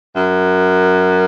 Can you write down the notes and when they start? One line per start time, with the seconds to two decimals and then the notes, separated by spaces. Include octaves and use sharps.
0.14 F#2